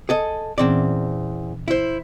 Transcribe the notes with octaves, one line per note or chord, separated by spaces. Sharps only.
G#4 A4 D#5
E2 A#2 E3 C4 C#4 D5
E4 C5